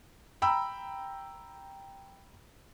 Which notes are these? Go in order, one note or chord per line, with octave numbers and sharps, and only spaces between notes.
G5 A#5 B5 E6